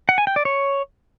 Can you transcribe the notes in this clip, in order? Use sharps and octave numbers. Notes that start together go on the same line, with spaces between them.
F#5
G#5
G5
D5
C#5